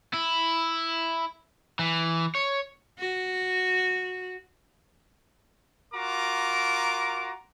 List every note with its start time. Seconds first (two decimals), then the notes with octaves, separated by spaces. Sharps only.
0.14 E4
1.79 E3
2.35 C#5
2.99 F#4
5.94 F4 F#4 A#4 A#5 D6